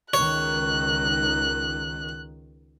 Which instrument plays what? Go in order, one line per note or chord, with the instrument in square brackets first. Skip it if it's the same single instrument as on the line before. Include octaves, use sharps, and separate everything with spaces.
[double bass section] C#2 D#3 [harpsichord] C#5 [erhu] F#6